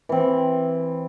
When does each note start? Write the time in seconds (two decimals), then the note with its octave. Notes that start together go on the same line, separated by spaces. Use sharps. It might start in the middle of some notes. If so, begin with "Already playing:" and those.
0.09 E3 C4